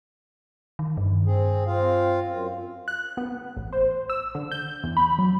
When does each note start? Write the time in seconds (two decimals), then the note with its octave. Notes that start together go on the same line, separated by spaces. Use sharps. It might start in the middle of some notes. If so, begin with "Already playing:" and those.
0.79 D#3
0.97 G2
1.26 C4 G#4
1.67 C4 F4 F5
2.27 F#2 F4
2.88 F#6
3.17 B3
3.57 A1
3.73 C5
4.10 E6
4.35 D3
4.52 G6
4.84 E2
4.97 B5
5.19 F#3